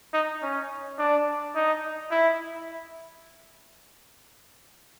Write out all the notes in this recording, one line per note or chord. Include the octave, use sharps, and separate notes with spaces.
D#4
C#4
D4
D#4
E4